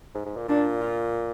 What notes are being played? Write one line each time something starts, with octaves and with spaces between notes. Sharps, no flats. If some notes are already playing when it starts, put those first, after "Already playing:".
G#2
G#2
A#2
A#2 D4
F4